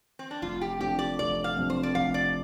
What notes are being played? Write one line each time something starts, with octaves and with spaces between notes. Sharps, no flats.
C4
D4
F1 F4
G4
F2 C3 F3 D4 G4
D5
F1 D5
F5
F2 C3 F3 D4
C5
D5
F1 F5
D5